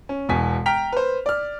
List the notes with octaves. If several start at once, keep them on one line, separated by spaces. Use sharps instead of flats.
C#4
E1 B2 G#5 B6
G5 A#5 F6 B6 F7
B4 C5
D5 F6